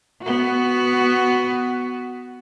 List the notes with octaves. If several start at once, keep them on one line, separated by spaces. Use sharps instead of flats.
B3 F#4